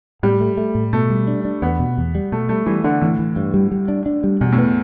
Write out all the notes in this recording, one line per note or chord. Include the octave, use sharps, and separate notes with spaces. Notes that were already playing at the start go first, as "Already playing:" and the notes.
A2 G3
A3
A3
A2
B2 A3
G3
D4
D4
E2 B3
B2
E2
G3
B2 A3
G3 A3
E3 G3
D3 D4
A2 E3
E3
G2
G3
G3
D4
D4
G3
E2 B2
A2
B3